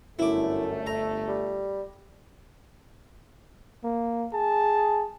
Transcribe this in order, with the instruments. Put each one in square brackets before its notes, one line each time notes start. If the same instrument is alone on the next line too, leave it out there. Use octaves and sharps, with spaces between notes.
[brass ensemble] G1 A3 [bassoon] F#2 [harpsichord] E4 D6
[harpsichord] A#5
[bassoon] G3
[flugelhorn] A#3
[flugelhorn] G#4 [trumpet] A5